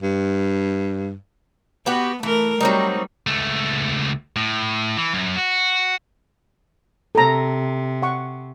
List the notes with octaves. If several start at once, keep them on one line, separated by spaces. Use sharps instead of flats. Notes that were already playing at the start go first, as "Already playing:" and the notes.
G2
B3 F#4 G4 B4
E3 A3 A#4
F#3 G3 C4 D#4
C#2 A3
A2
E3
F#2
F#4
C3 A4 A#5
F#5 C#6